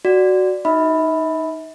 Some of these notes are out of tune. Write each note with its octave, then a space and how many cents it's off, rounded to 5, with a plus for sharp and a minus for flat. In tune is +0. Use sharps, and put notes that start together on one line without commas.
F#4 +5 D5 +0
D#4 +0 E5 -40 B5 +0